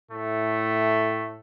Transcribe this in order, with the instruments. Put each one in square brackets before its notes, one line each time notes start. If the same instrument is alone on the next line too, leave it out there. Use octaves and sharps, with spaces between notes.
[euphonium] A2 [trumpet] A3